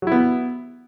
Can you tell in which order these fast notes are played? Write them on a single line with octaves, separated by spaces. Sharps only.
F#3 E4 B3